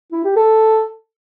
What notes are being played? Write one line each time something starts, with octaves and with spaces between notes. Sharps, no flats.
E4
G4
A4